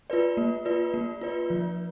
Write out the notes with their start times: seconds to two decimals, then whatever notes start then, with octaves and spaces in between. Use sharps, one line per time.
0.10 F4 B4 D5
0.37 A#3
0.65 F4 B4 D5
0.94 A#3
1.21 F4 B4 D5
1.50 F3